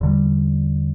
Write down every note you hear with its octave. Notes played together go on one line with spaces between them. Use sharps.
E2 D3 G3